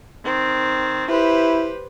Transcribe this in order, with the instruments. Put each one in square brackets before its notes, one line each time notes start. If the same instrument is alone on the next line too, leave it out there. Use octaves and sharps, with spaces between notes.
[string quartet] D#3 C4
[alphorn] E4 [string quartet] G4 B4 C5